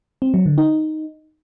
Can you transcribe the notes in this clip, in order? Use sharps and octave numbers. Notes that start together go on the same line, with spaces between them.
C4
F#3
D3
D#4